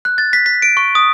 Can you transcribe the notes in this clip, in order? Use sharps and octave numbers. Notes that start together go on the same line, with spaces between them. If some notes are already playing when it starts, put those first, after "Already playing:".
F#6
A6
B6
B6
D7
C#6
D#6